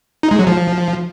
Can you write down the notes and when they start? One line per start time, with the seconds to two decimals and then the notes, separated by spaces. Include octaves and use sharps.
0.23 D#4
0.31 G#3
0.39 F#3
0.47 F3